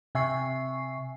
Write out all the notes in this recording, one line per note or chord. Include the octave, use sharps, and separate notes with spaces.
C3 E5 G#5 C#6 C7